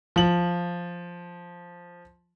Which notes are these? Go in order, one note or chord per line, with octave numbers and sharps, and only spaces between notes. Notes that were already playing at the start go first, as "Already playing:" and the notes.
F3 F#7